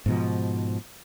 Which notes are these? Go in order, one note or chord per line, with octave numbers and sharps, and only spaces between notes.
G#2 B2 F3